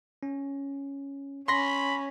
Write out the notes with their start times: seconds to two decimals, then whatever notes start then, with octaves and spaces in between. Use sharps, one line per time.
0.23 C#4
1.48 C#4 B5 C6 A#6